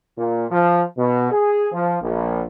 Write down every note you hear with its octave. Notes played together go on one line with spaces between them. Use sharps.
A#2
F3
B2
G#4
F3
A#1